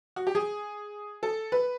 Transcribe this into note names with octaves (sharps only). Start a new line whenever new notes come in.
F#4
G4
G#4
A4
B4